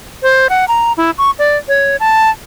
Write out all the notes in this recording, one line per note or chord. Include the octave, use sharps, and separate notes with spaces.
C5
F#5
A#5
E4
C#6
D5
C#5
A5